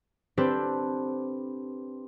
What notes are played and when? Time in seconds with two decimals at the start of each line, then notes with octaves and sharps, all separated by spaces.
0.37 C4 D4 G4 A4 B4